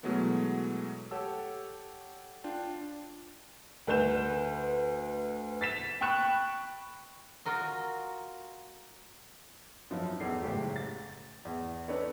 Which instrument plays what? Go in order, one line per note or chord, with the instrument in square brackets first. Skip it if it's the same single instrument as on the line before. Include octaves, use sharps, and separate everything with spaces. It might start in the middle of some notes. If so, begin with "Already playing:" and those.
[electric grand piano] B2 E3 F#3 G#3 A3 B3
G4 A4 C#5 F#5 A5 E6
D4 F4 G5 A5
[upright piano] D2 B4 G6 E7
A6 B6 E7
G5 B5 C#6 F#6 E7
[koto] F4 F#4 A#4 D#5
[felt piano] F#2 F3 D#4 E4
E2 A4 C7
F#1 A2 G#3 G4
A6
E2
D4 D#4 A4 B4 C#5 D5